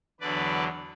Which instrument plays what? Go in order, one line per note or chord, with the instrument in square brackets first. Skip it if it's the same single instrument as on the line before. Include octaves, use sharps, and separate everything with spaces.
[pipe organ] E2 D3 F#3 B4 D5